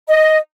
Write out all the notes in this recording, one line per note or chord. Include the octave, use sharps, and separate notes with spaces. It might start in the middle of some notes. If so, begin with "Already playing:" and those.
D#5